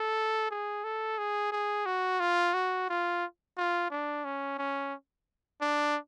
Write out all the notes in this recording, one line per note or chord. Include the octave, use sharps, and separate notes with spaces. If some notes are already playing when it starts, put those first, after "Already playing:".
Already playing: A4
G#4
A4
G#4
G#4
F#4
F4
F#4
F4
F4
D4
C#4
C#4
D4